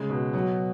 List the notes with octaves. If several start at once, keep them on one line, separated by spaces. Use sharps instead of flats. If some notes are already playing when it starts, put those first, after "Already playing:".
Already playing: C#3 G#3
B2
F#3